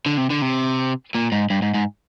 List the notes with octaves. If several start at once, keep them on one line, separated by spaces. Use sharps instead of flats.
D3
C3
D3
C3
A#2
G#2
G2
G#2
G#2